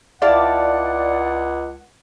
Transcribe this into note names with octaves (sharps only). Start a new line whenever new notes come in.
C#2 E4 D5 F5 F#5 A5